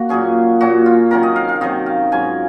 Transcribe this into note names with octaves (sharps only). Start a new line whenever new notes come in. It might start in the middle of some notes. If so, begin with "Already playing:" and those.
Already playing: A#3 F#4
A#2 F#3 C#4 G#4
A#2 F#3 C#4 F#4
F4
C3 D#3 F#3 C#4 A#4
D#5
F5
F5
C3 D#3 F#3 C#4 D#5
F5
G#2 F#3 C#4 F4 G#5